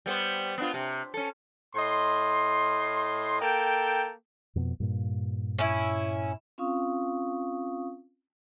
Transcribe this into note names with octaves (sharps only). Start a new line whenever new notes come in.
G3 B3 C5
B3 D4 F4
C3
C#4 A4
A2 D#5 C6
A#3 A4 G5
F2 B2 B3
G2 A#2
C#4 E4
C4 C#4 F4 F5 C#6 D#6